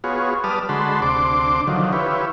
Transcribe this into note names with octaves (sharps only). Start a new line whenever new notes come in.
B3 F4 F#4 G#4 C#5
G3 B4 D5 A5 D#6 F6
D3 G#3 F#4 A5 B5 C6
D2 C3 D4 C6 D6
D3 D#3 F3 F#3
E4 F4 G4 B4 C#5